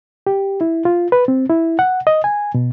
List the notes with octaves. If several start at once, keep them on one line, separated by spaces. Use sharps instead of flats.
G4
E4
F4
B4
C4
E4
F#5
D#5
G#5
B2